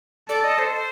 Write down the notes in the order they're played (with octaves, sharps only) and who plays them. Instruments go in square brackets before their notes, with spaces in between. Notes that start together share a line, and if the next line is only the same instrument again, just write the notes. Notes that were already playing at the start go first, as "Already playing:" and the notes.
[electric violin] A4 [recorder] D5
[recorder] D#5
C5